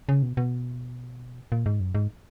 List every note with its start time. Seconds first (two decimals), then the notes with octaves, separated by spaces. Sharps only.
0.09 C#3
0.22 B2
0.37 B2
1.52 A#2
1.66 G#2
1.80 F#2
1.95 G#2